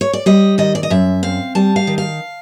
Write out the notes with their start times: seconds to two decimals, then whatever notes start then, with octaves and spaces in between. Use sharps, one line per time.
0.01 C#5
0.13 D5
0.26 G3 D#5
0.58 D#3 D#5
0.75 D5
0.83 D#5
0.90 F#2 E5
1.23 C4 F5
1.55 G3 A5
1.76 F5
1.87 D#3
1.98 F5